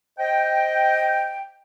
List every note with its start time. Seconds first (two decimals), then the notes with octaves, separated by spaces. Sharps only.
0.19 C5 D#5 G5